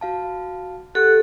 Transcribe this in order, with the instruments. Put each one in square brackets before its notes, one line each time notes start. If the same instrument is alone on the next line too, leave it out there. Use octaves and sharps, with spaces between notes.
[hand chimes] F#4 F5 A5
[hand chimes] G4 [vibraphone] A4 [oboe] F#5